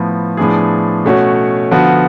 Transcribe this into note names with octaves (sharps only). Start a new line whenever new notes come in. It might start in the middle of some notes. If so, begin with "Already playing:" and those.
Already playing: A2 F3 B3
A2 F3 B3 D4 G#4
B2 A3 C#4 F#4 C#5
D3 F3 B3 F#4